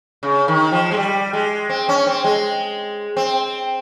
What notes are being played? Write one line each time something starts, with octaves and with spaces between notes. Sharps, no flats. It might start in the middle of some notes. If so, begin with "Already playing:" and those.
C#3
D#3
F3
G#3
G3
G#3
C4
C#4
C4
G#3
C4